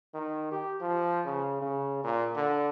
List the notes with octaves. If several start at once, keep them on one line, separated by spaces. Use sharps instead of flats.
D#3
G4
F3
C#3
C#3
A#2
D3